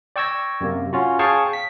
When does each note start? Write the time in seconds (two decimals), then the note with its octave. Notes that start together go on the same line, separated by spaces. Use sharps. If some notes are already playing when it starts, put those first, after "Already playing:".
0.16 D5 G5 C#6 E6 G#6 A#6
0.61 F#2 C3 A#3
0.93 C#4 F4 F#4
1.19 G#4 C#5 F5 G5 A5 C#6
1.53 B6